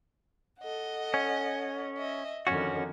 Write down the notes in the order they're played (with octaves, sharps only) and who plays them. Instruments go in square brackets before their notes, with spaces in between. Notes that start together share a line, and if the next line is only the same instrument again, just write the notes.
[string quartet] A4 D#5 F#5
[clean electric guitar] C#4
[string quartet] D#5 E5
[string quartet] F2 D3 D#3 [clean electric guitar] C#4 F#4